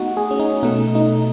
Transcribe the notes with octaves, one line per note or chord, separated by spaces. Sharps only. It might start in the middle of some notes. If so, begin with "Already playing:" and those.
Already playing: A3 B3 D#4 F#4
G#4
C#4
D#4
B2 A3 D#4
D#4